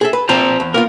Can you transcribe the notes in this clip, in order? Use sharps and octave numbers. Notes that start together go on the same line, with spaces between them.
G#4 A4 E5
B4
C4 F4 C5 A5 A#5
E2
A#3 B3 F4 A#4